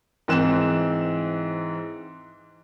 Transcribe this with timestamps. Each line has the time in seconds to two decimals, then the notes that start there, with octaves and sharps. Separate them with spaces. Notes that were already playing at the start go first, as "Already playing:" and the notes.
0.28 G#2 E3 C4 F#6 E7